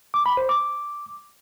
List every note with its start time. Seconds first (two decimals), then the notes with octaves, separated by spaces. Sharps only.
0.14 D6
0.26 B5
0.37 C5
0.49 D6